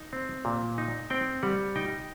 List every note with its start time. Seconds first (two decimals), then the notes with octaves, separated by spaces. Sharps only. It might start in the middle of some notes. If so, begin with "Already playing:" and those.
Already playing: D#4
0.13 C4
0.45 A#2
0.78 D#4
1.10 C4 G5
1.43 G3 F#5
1.76 D#4 G5